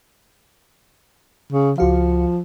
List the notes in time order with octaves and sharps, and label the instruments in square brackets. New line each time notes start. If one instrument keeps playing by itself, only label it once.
[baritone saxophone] C#3
[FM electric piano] C#2 F#4 F5 [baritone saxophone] F3